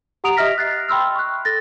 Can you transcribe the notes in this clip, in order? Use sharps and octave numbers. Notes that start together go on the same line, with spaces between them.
G4 F#5 A#5 D#6 D7 F7
G4 D#5 E5 F6 A#6 B6
F#6 A6 C7
G5 B5 C6 E6 F6
C#6 F#6
A4 A6 A#6